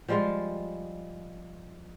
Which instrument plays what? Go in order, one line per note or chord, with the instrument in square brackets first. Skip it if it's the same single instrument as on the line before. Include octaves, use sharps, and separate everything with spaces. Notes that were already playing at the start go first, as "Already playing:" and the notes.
[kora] F3 G3 G#3 F4